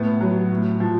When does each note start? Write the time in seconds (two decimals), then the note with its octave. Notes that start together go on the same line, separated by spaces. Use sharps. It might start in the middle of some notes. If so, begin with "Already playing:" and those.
Already playing: A2 B3
0.21 F#3
0.51 A2
0.80 F3